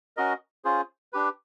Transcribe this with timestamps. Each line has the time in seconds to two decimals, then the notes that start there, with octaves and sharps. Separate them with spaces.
0.17 C#4 F#4 A#4 D#5
0.65 C#4 F4 G#4 C5
1.13 D4 G4 B4